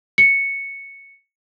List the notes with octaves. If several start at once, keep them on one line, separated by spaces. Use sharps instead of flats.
C#7